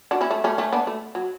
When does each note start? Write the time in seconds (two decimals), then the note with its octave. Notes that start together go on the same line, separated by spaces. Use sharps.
0.11 D4 F#4
0.21 C#4 E4
0.31 A3
0.44 A3 C#4
0.58 A3 C#4
0.73 B3 D4
0.87 A3
1.15 F#3